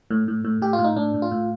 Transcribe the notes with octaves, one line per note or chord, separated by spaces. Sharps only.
A2
A2
A2
A2 G4
F4
A2
D#4
A2 D4
A2
F4
A2